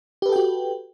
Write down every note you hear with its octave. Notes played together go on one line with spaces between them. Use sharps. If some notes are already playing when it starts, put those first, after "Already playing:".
F#4 G4 A4 B4 G5